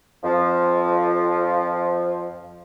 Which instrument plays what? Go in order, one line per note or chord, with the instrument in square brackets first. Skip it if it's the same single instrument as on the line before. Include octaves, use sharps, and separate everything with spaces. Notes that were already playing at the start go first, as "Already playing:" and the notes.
[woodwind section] F2 F3